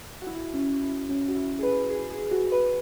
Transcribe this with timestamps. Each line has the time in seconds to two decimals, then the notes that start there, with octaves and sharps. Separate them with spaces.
0.22 F#4
0.27 E4
0.54 C#4
0.82 E4
1.09 C#4
1.28 F#4
1.35 E4
1.59 G#4
1.63 B4
1.90 G#4
2.11 G#4
2.31 F#4
2.52 B4